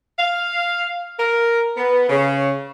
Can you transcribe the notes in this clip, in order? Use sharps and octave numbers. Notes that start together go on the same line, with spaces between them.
F5
A#4
B3
C#3